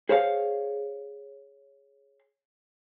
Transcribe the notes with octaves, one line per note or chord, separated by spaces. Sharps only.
G#4 C5 C#5 F5